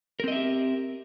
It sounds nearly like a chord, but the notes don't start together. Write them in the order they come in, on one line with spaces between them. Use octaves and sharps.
A#4 C4 D#5 E5 G4